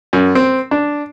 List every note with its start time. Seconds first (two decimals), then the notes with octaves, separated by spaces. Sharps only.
0.13 F#2
0.35 C4
0.71 D4